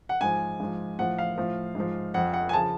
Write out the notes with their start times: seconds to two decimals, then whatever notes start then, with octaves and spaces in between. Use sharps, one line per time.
0.09 F#5
0.21 G#2 F3 G#5
0.60 G#2 F3
0.99 A2 F3 F#5
1.18 F5
1.38 A2 F3
1.75 G#2 F3
2.14 F2 F3 F#5
2.34 F#5
2.49 G#5
2.53 C#3 F3 A5